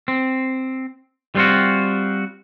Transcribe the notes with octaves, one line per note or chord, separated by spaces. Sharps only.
C4
G3 B3 C4 F4 F#4